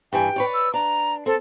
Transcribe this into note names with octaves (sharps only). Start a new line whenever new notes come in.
G2 E3 G5 G#5
B4 C#5 D5
E6
D4 A#5
C4 A4